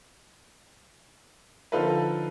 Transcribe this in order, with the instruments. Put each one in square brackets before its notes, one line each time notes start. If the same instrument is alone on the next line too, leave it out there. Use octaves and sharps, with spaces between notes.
[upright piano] D3 F3 D#4 F4 A4 B4